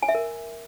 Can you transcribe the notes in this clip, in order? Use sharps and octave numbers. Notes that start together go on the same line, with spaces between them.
G#5
E5
A#4